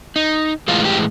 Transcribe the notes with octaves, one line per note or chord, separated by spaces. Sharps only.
D#4
A2 E3 G#3 F4
G4